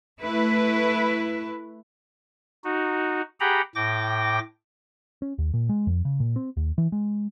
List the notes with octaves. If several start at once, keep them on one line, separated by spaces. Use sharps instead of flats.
A3 E4 B4
D#4 F#4
G4 G#4 F#5 G5 A#5 B5
A2 G5 D6 A#6
C#4
D#2
A#2
G#3
F2
C#3
A#2
C4
D#2
E3
G#3